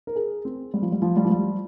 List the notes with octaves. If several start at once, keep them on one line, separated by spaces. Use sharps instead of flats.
A#4
G#4
C4
G3
F3
G3
F3
G3
F3
G3